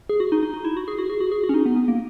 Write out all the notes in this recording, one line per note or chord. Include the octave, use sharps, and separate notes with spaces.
G#4
F#4
D#4
D#4
D#4
E4
F#4
G#4
F#4
G#4
F#4
G#4
F#4
C#4
D#4
B3
B3
A#3